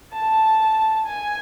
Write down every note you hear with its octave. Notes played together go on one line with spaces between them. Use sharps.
A5
G#5